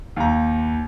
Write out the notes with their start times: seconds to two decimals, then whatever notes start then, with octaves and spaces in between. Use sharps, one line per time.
0.16 D#2 A#5